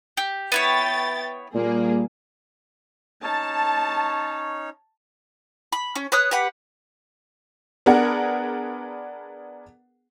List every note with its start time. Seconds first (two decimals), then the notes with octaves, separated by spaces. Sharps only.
0.17 G4
0.52 B3 E4 C#5 G5 A6
1.55 A#2 G3 A#3 G#4
3.23 C#4 D#4 C#5 A5
5.72 B5
5.95 C#4
6.12 B4 C#5 D#6 F#6
6.31 G4 B4 F#5 B5
7.86 B3 D4 G#4 A#4 F#5